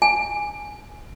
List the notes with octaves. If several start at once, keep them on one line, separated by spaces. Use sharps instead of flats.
G#5